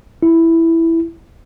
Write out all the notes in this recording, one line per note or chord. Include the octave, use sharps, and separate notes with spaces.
E4